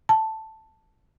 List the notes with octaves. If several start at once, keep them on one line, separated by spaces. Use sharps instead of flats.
A5